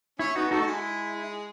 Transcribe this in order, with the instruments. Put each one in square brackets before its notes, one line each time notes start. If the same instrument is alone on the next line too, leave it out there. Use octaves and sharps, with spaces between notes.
[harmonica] C#4 C#5 [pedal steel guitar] E4
[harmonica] B3 B4 [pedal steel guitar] D#4 F#4
[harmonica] G#4
[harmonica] A3 A4 [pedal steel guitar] D#4 F#4
[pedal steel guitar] D#4
[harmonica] G#3 G#4 [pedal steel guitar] E4